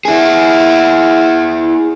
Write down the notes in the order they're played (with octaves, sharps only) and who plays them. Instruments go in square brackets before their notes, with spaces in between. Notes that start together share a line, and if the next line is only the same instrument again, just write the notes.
[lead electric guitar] E4 G#4